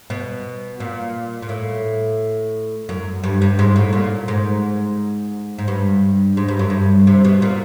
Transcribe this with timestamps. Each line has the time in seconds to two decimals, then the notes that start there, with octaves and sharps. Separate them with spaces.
0.10 B2
0.80 A#2
1.42 A#2
1.49 A2
2.89 F#2
3.23 G2
3.42 G2
3.59 G#2
3.76 A2
3.93 A#2
4.28 G#2
5.58 G#2
5.68 G2
6.37 G#2
6.48 G2
6.59 F#2
6.70 G2
7.07 C3
7.25 B2
7.42 A#2